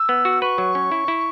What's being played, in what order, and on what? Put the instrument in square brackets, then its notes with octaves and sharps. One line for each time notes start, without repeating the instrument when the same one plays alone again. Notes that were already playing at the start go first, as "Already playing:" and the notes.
Already playing: [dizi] E6
[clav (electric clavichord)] B3
F#4
[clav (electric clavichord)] B4 [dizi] C#6
[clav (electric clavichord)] F#3
C#4
E4
E4